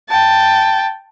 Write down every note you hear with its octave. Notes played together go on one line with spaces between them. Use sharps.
G5 A5